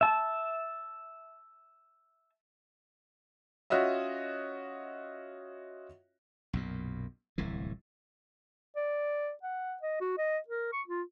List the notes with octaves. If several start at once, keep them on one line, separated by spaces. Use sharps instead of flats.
E5 A5
C#4 F4 F#4 C#5 D#5 E5
B1 F#2 A#2
D1 C2 A2 E3
D5
F#5
D#5
F#4
D#5
A#4
C#6
F4